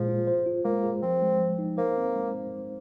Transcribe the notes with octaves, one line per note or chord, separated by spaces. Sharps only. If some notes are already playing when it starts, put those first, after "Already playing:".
Already playing: A#2 F3 G#3 G#4
F4
C5
F4
G#3 A#3
G#4
F3 C4
G#3
F3
D#4
A#3 C5
C4
G#3